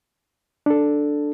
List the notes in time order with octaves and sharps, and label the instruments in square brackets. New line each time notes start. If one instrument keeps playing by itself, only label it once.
[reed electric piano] D4 A4